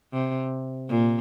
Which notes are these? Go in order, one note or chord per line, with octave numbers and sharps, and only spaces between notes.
C3
A#2